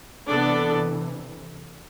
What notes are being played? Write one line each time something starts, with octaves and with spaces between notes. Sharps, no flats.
C3 E3 B3 D4 A4 D5